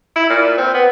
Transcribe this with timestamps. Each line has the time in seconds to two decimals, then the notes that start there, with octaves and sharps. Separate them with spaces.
0.16 E4
0.30 A#2
0.58 C4
0.74 B3